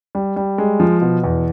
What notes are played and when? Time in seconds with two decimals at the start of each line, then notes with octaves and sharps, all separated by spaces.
0.15 G3
0.36 G3
0.58 G#3
0.80 F3
1.02 B2
1.24 E2